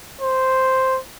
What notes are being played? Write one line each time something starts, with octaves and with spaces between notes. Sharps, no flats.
C5